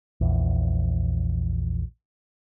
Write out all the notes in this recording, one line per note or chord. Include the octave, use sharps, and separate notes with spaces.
A#1 E2